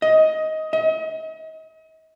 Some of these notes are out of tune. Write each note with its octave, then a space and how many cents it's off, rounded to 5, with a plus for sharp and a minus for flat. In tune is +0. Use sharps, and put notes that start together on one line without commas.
D#5 +15
D#5 +40